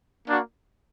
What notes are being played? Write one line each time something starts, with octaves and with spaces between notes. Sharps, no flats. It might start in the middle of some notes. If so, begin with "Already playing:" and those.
A#3 D4 F#4